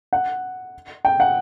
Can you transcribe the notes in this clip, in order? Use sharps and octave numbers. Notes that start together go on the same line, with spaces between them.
F#5
G5
F#5